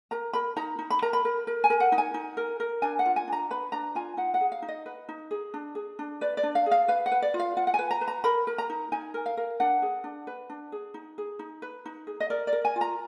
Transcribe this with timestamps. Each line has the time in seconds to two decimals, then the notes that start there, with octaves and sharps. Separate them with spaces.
0.11 A#4 A#5
0.33 A#4 B5
0.56 D#4 A#5
0.79 D#4
0.90 B5
1.02 A#4 A#5
1.13 B5
1.25 A#4
1.47 A#4
1.64 G#5
1.70 A#4
1.80 F#5
1.92 D#4
1.98 G#5
2.14 D#4
2.37 A#4
2.60 A#4
2.82 D4 G#5
2.99 F#5
3.05 F4
3.16 G#5
3.27 D4 A#5
3.51 B4 B5
3.72 D4 A#5
3.95 F4 G#5
4.17 D#4 F#5
4.34 F#5
4.41 G#4
4.52 F5
4.62 D#4
4.68 D#5
4.86 B4
5.09 D#4
5.31 G#4
5.54 D4
5.75 G#4
5.99 D4
6.21 B4 D5
6.37 D5
6.43 D4
6.55 F5
6.66 G#4
6.71 F5
6.88 B4 F5
7.06 F#5
7.12 B4
7.22 D5
7.34 F4
7.39 F5
7.57 F4 F#5
7.67 F#5
7.74 B4 G#5
7.91 A#5
8.01 B4
8.08 A#5
8.24 A#4 B5
8.47 A#4
8.58 A#5
8.70 D#4
8.92 D#4 G#5
9.14 A#4
9.26 F5
9.37 A#4
9.60 D4 F#5
9.82 G#4
10.04 D4
10.27 B4
10.50 D4
10.72 G#4
10.94 D#4
11.18 G#4
11.39 D#4
11.62 B4
11.86 D#4
12.07 G#4
12.20 D#5
12.30 A#4 D5
12.47 D5
12.53 A#4
12.65 G#5
12.76 F4
12.81 A#5